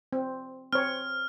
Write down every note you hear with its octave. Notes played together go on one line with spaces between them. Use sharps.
C4
C4 C#5 F6